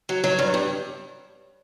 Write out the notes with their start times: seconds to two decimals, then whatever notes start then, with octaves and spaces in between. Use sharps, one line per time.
0.09 F#3
0.24 F#3
0.39 G2
0.54 G2